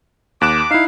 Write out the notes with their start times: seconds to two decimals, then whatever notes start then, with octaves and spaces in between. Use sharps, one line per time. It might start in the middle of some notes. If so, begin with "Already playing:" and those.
0.41 D#2 D6 F#6 E7
0.71 D#4 E4 F5